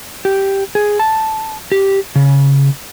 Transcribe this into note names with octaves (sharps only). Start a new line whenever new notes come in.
G4
G#4
A5
G4
C#3